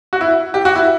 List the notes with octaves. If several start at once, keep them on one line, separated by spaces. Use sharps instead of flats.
F#4
E4
G4
F#4
E4